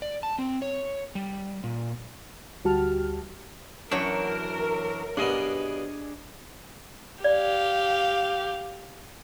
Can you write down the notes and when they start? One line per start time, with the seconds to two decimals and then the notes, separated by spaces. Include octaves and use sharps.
0.02 D5
0.23 A5
0.39 C4
0.62 C#5
1.15 G3
1.64 A#2
2.64 D2 G3 F#4 G4 A5 F6
3.92 F#2 E3 F#3 D4 A#4 C#5
5.17 G2 B2 B3 D4 G#4 D#5
7.24 G4 D5 F5